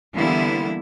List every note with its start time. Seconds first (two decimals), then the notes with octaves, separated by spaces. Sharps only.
0.13 D3 E3 G3 A#3 B3 E4